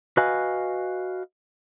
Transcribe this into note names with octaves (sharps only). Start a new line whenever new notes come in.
F#4 B4 D#5 F5 G#5